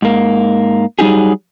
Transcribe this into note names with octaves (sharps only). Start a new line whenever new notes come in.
G#2 A#3
F#3 G3 D#4 G4 G#4